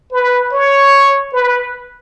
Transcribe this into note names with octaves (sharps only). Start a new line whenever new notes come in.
B4
C#5
B4